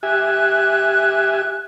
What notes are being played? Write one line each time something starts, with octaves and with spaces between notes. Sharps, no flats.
G4 E5 G#5 F#6